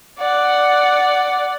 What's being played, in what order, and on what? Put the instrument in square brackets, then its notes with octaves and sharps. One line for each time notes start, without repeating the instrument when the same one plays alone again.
[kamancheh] D5 F#5